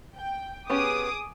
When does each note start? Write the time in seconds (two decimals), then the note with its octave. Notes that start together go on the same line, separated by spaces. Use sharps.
0.16 G5
0.70 B3 C#4 G4 G#4 D6 D#6